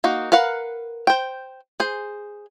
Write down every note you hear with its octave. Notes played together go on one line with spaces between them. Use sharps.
A#3 D#4 F#4
A#4 B4 F5 F#5
C5 G5
G#4 C5